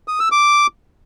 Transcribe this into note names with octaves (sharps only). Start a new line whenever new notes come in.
D#6
E6
D6